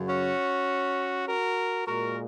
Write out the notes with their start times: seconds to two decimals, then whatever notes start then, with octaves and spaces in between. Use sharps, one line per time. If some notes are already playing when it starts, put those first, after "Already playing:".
Already playing: F#2 C#3 F#3
0.08 C#4 F#4
1.27 F#4 A#4
1.87 A#2 G#3 F#4 A#4